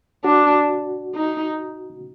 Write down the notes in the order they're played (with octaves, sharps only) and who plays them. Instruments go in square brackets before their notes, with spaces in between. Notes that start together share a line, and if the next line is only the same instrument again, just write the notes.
[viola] D4 [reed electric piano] F#4
[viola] D#4